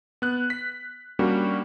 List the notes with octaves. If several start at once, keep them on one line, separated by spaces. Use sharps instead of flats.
B3 F#6
B6
G3 A#3 C#4 D4 F#4